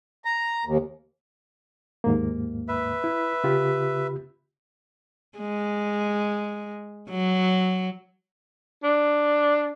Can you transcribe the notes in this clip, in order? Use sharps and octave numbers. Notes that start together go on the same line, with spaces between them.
A#5
D#2
D#2 G#2 A#3
B4 E5
E4
C#3 F4 G4
G#3
F#3
D4